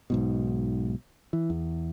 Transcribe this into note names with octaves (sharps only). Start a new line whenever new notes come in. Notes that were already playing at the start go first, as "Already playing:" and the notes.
B1 G#2 B2
E3
E2